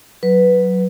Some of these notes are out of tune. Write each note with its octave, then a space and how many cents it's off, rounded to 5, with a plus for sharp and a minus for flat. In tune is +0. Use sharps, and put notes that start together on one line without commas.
F#3 +0 B4 +0